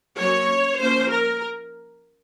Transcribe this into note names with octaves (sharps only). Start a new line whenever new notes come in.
F#3 A#3 C#4 C#5
F3 A#3 C#4 C5
A#4